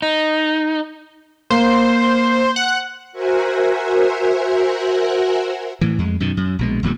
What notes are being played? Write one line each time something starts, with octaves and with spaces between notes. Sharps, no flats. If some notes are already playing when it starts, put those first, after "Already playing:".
D#4
A#3 C5
F#5
F#4 A#4 C5 E5 F#5 G#5
A2 E3
F2 G#3
F#2 B2 D#3
F#2
A#1 B2 G#3
E1 A#2 D3 G3